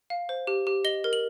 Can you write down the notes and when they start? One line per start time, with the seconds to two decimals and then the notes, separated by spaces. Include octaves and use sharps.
0.10 F5
0.29 C5
0.47 G4
0.67 G4
0.84 D#5 G7
1.04 A#4
1.13 F#7